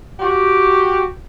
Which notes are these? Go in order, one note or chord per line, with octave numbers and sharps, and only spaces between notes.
F#4 G4